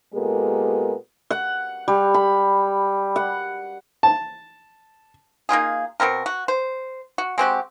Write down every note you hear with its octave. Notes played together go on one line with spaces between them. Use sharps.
A#2 G#3 B3 G4 A4 A#4
F#5
G3
B5
F#5
A5
A#3 D#4 F4 G#4
B2 G3 C4 A#4
F#4
C5
F#4
G#3 C4 F#4 G4